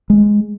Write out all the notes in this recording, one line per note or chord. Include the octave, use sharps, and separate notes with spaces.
G#3